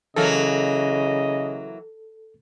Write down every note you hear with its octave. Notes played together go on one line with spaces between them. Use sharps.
C#3 E3 F#3 A#3 A4 D#5